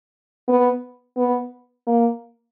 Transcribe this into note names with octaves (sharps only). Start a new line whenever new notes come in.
B3
B3
A#3